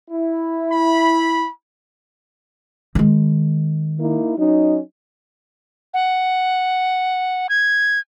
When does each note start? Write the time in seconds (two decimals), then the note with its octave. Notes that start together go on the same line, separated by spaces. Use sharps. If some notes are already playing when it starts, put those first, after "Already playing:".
0.10 E4
0.70 B5
2.95 D#3 G#3
4.00 A#3 D#4 E4
4.37 F#3 C#4 D#4
5.94 F#5
7.49 G#6